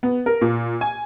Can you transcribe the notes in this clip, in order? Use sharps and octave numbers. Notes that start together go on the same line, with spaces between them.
B3
A#4
A#2
G#5